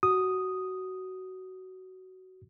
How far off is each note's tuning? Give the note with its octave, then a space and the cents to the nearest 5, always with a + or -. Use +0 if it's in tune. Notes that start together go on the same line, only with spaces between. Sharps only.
F#4 +15 D#6 +0